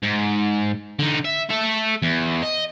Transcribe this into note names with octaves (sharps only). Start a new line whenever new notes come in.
G#2
D3 D#4
E5
A4 E5
E2
D#5